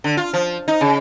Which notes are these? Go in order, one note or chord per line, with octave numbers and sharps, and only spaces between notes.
D3
F4
F3
D#4
C#3